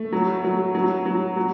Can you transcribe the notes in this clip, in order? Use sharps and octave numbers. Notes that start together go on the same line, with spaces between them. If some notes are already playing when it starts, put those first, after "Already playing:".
Already playing: A3
F#3
F#3
F#3
F#3
F#3